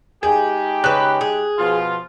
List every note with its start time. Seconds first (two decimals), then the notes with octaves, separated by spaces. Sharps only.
0.23 G#3 D#4 G4 G#4
0.84 C#3 B4 F#6
1.21 G#4
1.58 B2 F3 F4